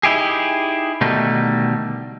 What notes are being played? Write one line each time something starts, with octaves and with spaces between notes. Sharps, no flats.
D#4 E4 G4 G#4
B2 D3 D#3 G3 A3 D#4